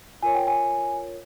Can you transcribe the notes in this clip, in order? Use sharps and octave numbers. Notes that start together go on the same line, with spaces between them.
F4 A#4 C#5 G#5
G5
G#5